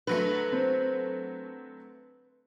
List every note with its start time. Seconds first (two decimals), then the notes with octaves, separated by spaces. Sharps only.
0.07 D3 F#3 A3 B4
0.52 C4